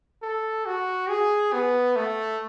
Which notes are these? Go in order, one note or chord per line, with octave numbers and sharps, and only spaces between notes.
A4
F#4
G#4
B3
A3